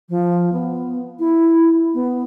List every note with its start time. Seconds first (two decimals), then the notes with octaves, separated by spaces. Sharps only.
0.09 F3
0.52 B3
1.19 E4
1.94 B3